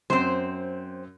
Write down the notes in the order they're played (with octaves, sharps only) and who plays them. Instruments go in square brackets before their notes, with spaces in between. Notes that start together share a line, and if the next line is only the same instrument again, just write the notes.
[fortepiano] F#2 [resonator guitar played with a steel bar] C4 C5